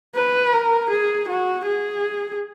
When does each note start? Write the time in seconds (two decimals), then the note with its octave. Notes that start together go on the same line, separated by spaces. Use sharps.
0.16 B4
0.53 A#4
0.91 G#4
1.29 F#4
1.67 G#4